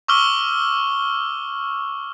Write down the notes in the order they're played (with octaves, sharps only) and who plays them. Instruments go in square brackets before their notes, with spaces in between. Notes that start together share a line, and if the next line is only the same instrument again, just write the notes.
[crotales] C#6 D6 E6 F6 G7